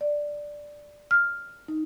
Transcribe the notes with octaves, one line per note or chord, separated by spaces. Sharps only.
D5
F6
D#4